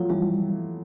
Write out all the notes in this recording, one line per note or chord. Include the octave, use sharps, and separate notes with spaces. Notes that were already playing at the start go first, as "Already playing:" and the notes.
Already playing: F3 F#3 A3 F4
E3 G3